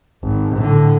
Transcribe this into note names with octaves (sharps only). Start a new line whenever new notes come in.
G#1
A2 D3